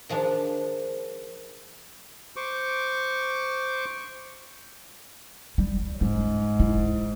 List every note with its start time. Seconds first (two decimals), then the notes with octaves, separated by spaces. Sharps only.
0.09 D#3 F3 G#3 D4
2.36 C5 C#6 D6
5.58 G3
6.01 G#2 C#4
6.60 E4